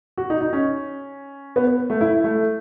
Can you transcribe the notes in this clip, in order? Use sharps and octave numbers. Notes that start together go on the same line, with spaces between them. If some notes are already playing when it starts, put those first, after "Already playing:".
F#4
D#4
D#4
C#4
B3
B3
A3
E4
A3